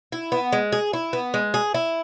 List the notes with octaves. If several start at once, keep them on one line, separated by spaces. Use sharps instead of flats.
E4
B3
G#3
G#4
E4
B3
G#3
G#4
E4